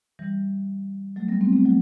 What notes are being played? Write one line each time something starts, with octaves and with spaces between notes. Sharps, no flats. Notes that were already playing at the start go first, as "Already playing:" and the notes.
E3 G3
F#3 A3
G3 B3
A3 C4
A3 C4
F#3 A3